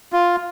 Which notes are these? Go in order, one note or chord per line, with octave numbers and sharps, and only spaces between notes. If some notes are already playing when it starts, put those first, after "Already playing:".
F4